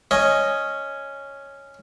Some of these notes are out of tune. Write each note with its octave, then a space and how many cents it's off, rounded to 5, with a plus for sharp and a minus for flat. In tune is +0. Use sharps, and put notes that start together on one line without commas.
C#4 +0 D#5 +0